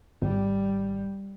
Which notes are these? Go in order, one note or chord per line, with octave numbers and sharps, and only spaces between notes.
G#1 G3